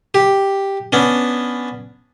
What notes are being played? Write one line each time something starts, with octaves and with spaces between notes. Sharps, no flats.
G4
B3 C#4 D4